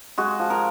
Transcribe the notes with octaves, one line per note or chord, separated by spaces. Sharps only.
G#3 F#4
F3
A#4